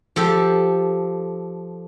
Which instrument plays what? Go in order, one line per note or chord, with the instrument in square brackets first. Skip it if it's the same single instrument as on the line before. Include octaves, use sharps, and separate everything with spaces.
[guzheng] F3 G4 A4